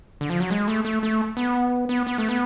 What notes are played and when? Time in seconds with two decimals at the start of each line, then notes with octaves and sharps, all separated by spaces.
0.21 D3
0.30 F3
0.40 F#3
0.51 G#3
0.68 A3
0.85 A3
1.03 A3
1.37 B3
1.89 B3
2.07 B3
2.18 A3
2.29 B3